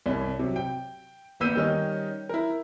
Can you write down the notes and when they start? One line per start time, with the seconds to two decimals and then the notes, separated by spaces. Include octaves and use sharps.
0.06 C2 C#4
0.39 C3 F#3
0.56 G5
1.40 G#1 A#3 B3 E6 G6 D#7
1.55 D#3 G3 C#4 D#4
2.29 E4 A#4